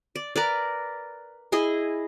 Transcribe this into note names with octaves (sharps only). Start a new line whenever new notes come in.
D5
A#4 B4 D5
E4 G#4 D#5